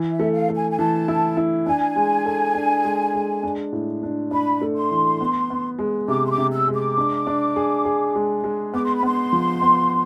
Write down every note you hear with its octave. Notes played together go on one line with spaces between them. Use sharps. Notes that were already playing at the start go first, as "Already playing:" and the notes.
Already playing: E3
E5
A3
F5
A3
G#5
G#5
E3 A5
E4
E4
D4 G#5
G#3
A4
D4
G#3
G#3
D4
A2
D4
D4 B5
A3
C6
E3
B3
B3
G#3
C3 D6
C6
D6
C3
E6
G#3
D6
D4
D4
G#4
G#4
G#3
G#3
B3 D6
C6
B5
B3 C6
F3
B3